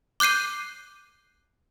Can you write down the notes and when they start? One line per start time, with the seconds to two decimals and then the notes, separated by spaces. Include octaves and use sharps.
0.20 D6 F#6 G6 C7 D#7